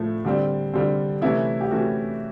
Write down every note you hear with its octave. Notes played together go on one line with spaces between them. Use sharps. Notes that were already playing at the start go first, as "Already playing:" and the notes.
Already playing: A2 F3 A3
D3 G3 C4
D3 G3 C4
C3 E3 A3 C#4 E4
G4
C3 E3 A3 C#4 F#4